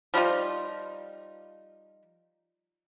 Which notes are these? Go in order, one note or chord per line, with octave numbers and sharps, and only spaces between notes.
F3 G3 D#4 F4